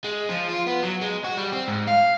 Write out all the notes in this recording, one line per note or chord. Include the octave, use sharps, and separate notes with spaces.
G#3
F3
F4
B3
F#3
G#3
F#4
G3
C4
G#2
F5